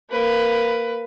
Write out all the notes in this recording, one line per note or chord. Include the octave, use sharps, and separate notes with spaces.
A#3 B4